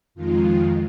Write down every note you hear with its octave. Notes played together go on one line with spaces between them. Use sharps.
F2 D#3 G#3 F4